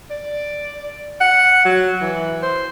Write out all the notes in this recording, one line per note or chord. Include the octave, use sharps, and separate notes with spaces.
D5
F#5
F#3
E3
C5